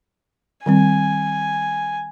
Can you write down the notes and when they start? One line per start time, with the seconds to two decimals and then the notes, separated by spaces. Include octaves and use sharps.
0.66 D#3 G3 C4 G#5